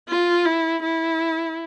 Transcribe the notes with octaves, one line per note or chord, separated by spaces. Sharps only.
F4
E4
E4